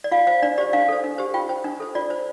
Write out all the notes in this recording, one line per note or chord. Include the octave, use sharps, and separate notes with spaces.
D5
F4 F5
C5 F5
D4 D5
G4 C5 D5
D4 F5
A4 C5
D4
G4 C5
F4 G5
C5
D4
A4 C5
F4 D5
C5